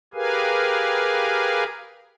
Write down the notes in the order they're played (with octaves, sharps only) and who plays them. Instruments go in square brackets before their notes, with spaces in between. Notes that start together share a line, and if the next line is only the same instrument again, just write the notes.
[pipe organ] G4 G#4 A#4 B4 F5 G#5